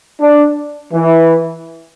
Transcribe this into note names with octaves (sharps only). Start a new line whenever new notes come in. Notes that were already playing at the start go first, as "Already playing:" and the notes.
D4
E3